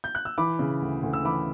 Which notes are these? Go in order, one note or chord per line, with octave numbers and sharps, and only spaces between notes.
G6
F#6
E6
E3 B5 D6
C#3
D2
D2
E6
E3 B5 D6